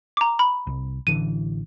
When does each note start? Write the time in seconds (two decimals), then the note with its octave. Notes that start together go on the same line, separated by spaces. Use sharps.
0.17 A#5 D6
0.39 B5
0.67 C2
1.07 A1 D3 E3 D#7